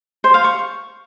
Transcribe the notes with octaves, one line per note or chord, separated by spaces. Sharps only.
C5
F5
C#6